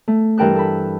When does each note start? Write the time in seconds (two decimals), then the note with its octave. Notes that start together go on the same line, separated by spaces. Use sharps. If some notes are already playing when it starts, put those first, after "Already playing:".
0.08 A3
0.38 G2 E3 A#4 G5 A5 F#6
0.55 A4 B5